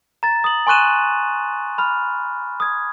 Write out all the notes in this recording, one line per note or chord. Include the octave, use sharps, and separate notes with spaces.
A#5 A6
D#6 F#7
G#5 C6 C#6 F#6 D#7 E7
B5 F6
D#6 G#6